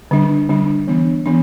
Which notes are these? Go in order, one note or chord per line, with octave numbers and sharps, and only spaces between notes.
D3 G3 D4
D3 G3 D4
E3 B3 D4
E3 B3 D4